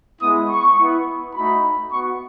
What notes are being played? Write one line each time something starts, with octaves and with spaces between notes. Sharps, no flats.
G#3 B3 E4 D#6
C#6
B3 E4
A3 D#4 F#4 B5
B3 F#4 C#6